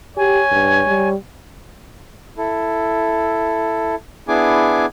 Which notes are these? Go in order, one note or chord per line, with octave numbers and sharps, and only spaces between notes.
G4 C#5 G#5
G2
G3
E4 A4
B3 D4 E4 G#4 G#5 D6